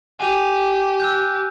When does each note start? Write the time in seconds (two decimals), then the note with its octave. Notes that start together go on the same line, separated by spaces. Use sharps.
0.20 G4 G#5 D#7 F7
1.00 E6 F#6 G6